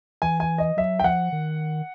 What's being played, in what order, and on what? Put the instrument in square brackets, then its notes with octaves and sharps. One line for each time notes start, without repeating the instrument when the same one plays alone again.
[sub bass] E3 [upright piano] G#5
[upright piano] G#5
D#5
[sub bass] F#3 [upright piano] E5
[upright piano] G5
[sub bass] F3 [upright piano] F#5
[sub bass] D#3